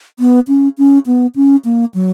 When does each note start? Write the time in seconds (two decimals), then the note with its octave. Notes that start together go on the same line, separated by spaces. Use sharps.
0.19 B3
0.48 C#4
0.78 C#4
1.06 B3
1.36 C#4
1.65 A#3
1.94 F#3